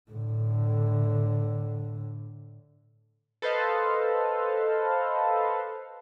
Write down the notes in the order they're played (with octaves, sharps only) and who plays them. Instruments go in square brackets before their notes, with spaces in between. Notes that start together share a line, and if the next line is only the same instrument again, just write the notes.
[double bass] A2 D3
[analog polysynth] A4 B4 C5 D#5 F5